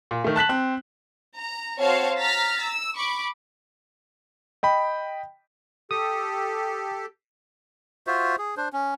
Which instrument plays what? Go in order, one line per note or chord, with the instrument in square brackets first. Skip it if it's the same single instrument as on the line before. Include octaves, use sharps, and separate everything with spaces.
[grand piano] A#2
D#3 A3
A5 F#6 B6 F#7
C4 F#6
[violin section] A#5
C4 F#4 C5 C#5 F5 A5
A#5 F6 A6 B6
E6
B5 C#6 D6
[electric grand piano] D#5 G5 B5
[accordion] G4 A4 [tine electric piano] D#6
[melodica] F4 F#4 C5 E5
G#4
D4 C5
C#4